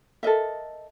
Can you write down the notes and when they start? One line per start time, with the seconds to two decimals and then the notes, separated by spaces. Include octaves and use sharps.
0.23 A4 A#4 D#5 E5